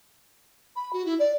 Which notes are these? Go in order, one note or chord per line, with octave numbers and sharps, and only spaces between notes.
B5
F#4
E4
D5